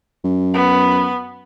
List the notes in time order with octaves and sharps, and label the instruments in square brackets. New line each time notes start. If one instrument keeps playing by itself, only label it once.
[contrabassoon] F#2
[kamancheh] B3